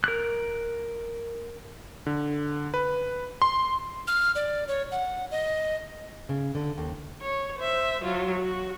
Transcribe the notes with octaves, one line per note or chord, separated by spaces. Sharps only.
A#4 F#6
D3
B4
C6
F6
D5
C#5
F#5
D#5
C#3
D3
D#2
C#5
C5 E5
F#3 F4
F#4